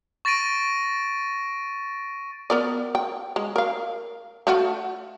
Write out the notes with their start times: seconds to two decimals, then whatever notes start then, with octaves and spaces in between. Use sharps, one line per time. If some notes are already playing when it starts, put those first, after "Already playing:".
0.25 C#6 A6 A#6 D7 D#7
2.50 B3 A#4 D5
2.95 G5
3.36 G#3
3.56 A#4 F5
4.47 A3 F4 F#4